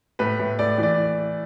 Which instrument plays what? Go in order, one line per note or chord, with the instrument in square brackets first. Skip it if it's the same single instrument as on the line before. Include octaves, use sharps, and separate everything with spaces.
[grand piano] A2 B4
A2
A2 D5
E3 D5